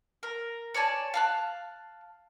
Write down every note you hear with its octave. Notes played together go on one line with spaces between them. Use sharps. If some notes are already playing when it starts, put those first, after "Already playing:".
A#4
C#5 D5 G#5 A5
F5 A5 F#6